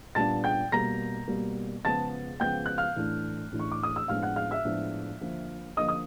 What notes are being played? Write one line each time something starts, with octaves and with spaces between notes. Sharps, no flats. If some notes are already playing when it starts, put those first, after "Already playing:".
A#2 G3 B3 D4 A5 A6
G5 G6
B2 G3 A#3 A#5 A#6
B2 G3 A#3
C#3 F3 G#3 B3 A5 A6
C#3 F3 G#3 B3 G5 G6
F#6
F5 F6
A2 E3 A3 D4
A2 E3 A3 D4
C#6
D6
D#6
E6
A2 F3 G#3 B3 D4 F5 F6
F#5 F#6
F5 F6
E5 E6
A2 F3 G#3 B3 D4
D3 F3 A#3
D3 F3 A#3 D#5 D#6
D#6